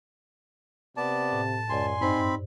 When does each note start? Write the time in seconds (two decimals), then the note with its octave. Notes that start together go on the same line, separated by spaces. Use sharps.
0.97 C3 B3 D5 A5
1.32 A2
1.69 C#2 F#2 D5 G#5 C6
2.01 G2 C4 D#4 C5 B5